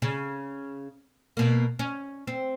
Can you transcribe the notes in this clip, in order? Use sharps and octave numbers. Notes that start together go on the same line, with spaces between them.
C#3
B2 A#3
C#4
C4